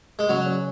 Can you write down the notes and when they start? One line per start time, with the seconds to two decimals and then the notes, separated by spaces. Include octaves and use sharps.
0.19 G#3
0.29 C#3 F#3
0.46 C#4